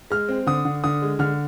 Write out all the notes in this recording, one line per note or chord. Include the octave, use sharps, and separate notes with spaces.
G#3 F6
C4
D3 D#6
D3
D3 D#6
G#3
D3 F6